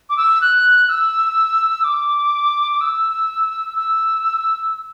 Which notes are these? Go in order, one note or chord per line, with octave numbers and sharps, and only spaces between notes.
D6
E6
F#6
E6
D6
E6
E6